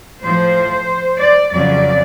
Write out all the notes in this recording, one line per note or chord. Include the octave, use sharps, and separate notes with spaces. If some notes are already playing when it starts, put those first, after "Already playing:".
A2 F3 C5
D5
F2 C#3 F#3 D5